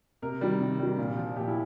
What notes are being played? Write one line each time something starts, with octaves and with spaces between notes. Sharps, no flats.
C3 A#4
D#3 G3
C3
D#3 G3
A#2
F3
A#2 G4
E4